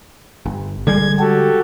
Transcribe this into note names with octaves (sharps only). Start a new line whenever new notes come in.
G1
D3 G3 G#3 G#6
F#4 G4 A4